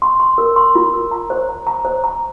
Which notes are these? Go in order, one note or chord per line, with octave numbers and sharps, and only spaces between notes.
C6
C6
A#4
C6
F4
A#4
A#5
C5
A#5
A#5
C5
A#5